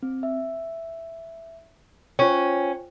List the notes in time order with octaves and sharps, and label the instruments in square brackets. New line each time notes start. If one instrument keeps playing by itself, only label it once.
[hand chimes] C4
E5
[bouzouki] C#4 [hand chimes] F4 C5 G5